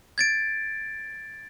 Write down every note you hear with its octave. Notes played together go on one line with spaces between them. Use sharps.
G#6 A6 D7